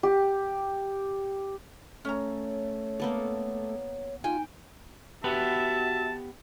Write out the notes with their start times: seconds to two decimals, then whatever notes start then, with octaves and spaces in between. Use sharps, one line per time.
0.03 G4
2.05 A3 C#4 C#5 A#5
3.00 A#3 B3 A4
4.24 D#4 F4 G5 G#5
5.24 B3 F#4 G4 B4 E5 A5